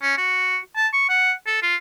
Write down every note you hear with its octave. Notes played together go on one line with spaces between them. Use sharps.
C#4
F#4
A5
C#6
F#5
A4
F4